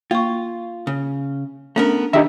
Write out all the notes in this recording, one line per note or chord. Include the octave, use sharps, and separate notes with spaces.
A#3 F4 C#6
C#3
A3 B3 C#4 D4 A#4
D#3 D4 D#4 G4 E5